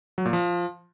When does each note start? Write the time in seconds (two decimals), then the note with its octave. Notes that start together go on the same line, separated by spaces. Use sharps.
0.18 F#3
0.25 A#2
0.33 F3